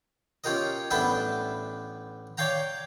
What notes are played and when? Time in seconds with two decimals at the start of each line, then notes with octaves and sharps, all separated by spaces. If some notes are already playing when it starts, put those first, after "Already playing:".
0.44 C#4 F4 G4 A#4 D#5
0.91 A1 B3 D4 B4 E5 G5
2.38 C#5 D5 F5 G5 A#5